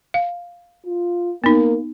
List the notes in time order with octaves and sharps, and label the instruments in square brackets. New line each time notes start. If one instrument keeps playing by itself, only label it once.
[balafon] F5
[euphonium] F4
[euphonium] A#3 [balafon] B3 D#4